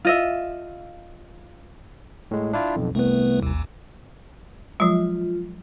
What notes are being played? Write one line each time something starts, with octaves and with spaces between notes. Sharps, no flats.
F4 D#5 E5
A2 G#3
D4 E4 F4
B1 F2
C2 A3 B3 B4
A1 D#2
F3 F#3 G#3 F4